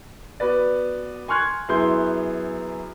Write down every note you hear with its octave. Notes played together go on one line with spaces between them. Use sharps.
B3 F#4 B4 D5
G#5 C6 C#6 F6 F#6 G#6
F#2 B3 E4 G#4 C6 G6